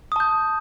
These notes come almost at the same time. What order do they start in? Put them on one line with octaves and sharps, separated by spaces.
D#6 A5 G6